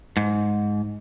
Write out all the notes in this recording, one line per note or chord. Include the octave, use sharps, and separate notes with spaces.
G#2